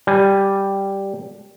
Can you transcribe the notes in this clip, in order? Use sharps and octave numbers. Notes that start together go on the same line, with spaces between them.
G3 G#5